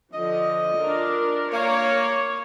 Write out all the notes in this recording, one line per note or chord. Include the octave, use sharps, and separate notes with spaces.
D3 F3 D#5
D4 F4 A#4
A#3 C#5